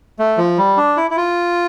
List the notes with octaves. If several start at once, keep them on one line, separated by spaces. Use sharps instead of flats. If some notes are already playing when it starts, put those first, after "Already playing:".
A3
F3
G3
D4
E4
E4
F4